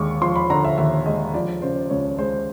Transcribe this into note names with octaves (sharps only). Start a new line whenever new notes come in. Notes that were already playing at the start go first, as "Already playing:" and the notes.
Already playing: D#2 D3 G#3 C#6 D6
F3 C6
B5
D3 A#5
E5
D#2 E5
G#3 D#5
F3 D5
C#3 C5
C#2 C#5
G#3 C5